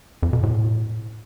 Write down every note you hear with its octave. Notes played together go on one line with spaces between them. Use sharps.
F2
B2
A2